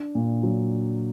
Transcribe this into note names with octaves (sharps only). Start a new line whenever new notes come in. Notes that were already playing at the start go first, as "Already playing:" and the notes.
Already playing: D4
A#2
F#3